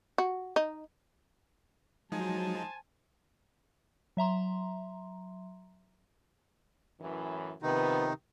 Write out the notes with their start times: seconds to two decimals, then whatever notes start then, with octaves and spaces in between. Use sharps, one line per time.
0.18 F#4
0.56 D#4
2.12 F3 F#3 G#3 D#4 C5 G#5 A5
4.17 F#3 E5 A#5 C6
7.00 F#2 A2 E3
7.62 C3 D#3 F3 B3 D#4 B4